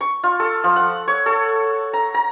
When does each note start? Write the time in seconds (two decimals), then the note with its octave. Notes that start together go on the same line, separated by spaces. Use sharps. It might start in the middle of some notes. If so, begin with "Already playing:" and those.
0.01 C#6
0.23 F4
0.40 A4
0.64 F3
0.76 F#5
1.08 C#5
1.26 A4
1.93 A#5
2.14 A#5